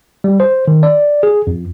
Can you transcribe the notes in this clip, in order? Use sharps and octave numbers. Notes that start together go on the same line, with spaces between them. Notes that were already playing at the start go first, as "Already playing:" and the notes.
G3
C5
D#3
D5
G#4
F2